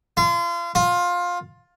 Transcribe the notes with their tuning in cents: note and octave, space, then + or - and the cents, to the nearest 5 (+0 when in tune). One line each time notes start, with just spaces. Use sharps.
F4 -35
F4 +15